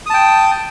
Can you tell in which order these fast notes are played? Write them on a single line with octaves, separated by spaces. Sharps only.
D#6 A5 G5